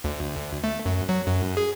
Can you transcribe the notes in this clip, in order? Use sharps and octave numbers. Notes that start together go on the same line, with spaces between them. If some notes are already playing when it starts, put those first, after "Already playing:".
D2
A3
F#2
F#3
F#2
G#4